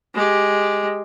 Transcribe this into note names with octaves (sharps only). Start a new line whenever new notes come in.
G#3 G4